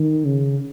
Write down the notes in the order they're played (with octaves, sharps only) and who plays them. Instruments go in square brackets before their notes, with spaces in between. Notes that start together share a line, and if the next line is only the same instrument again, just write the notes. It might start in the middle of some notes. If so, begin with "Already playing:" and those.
Already playing: [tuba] D#3
C#3